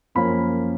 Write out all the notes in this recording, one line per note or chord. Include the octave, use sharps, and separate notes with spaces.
F#2 F3 A#3 C#4 B5